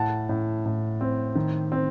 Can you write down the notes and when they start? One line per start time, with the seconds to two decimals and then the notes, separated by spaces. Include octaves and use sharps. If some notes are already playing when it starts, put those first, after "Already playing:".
Already playing: A2 F#5 A5
0.29 A2
0.66 A2
1.01 C4
1.35 D#3
1.72 C4